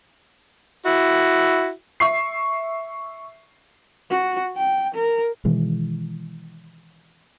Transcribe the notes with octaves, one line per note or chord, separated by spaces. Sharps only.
E4 F#4
E5 C#6 C7
F#4
G5
A#4
B2 D#3 E3 G#3